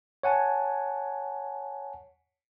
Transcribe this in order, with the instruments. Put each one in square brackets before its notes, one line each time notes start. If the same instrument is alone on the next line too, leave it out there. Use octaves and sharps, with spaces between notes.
[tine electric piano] C#5 F#5 G#5 A5